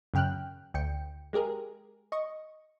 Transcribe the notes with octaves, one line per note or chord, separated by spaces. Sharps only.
F#2 C#3 G5 F6 F#6
D2 G5 C#7
G#3 G4 G#4 A#4
D#5 C#6